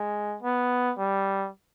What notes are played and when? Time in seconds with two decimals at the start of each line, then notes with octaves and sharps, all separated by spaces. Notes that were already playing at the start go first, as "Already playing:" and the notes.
Already playing: G#3
0.43 B3
0.98 G3